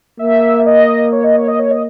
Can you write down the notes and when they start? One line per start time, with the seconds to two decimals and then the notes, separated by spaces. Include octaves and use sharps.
0.19 A#3 E5
0.66 D#5
1.12 C#5
1.24 D#5
1.36 C#5
1.48 D#5
1.59 C#5
1.71 D#5